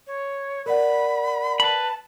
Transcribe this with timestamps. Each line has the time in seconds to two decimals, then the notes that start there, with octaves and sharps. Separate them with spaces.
0.07 C#5
0.66 A#4 D5 F#5 B5
1.60 B4 A5 B5